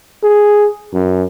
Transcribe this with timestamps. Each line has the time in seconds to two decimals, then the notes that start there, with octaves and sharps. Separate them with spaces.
0.23 G#4
0.93 F#2